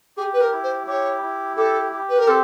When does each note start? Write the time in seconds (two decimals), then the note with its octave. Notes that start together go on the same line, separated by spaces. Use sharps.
0.17 G4 G#4
0.33 B4
0.41 A#4
0.52 E4
0.63 C5
0.87 G4 C#5
1.22 E4
1.57 G4 A4
1.92 G4
2.09 B4
2.18 A#4
2.27 C4 A4